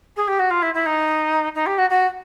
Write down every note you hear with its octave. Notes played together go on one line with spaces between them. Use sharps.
G#4
G4
F#4
F4
E4
E4
D#4
D#4
G4
F#4
F#4